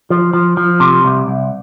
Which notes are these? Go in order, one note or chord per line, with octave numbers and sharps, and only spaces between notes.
F3
F3
F3
C3
C2
C2